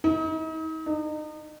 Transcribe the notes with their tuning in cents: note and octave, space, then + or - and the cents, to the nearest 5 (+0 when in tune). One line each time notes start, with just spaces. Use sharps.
D#4 +40
D#4 -35